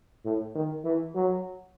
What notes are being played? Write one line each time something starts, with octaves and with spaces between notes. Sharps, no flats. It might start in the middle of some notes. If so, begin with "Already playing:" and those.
A2
D#3
E3
F#3